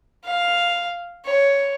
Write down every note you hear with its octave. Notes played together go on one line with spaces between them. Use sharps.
F5
C#5